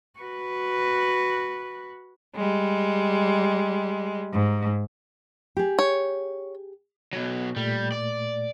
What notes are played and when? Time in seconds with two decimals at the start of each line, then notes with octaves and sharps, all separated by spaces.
0.19 F#4 B4
2.36 G3 G#3
4.31 G#2
5.57 G4 G#4
5.79 C#5
7.13 B2 F#3
7.56 A#2 G3 A3
7.92 D5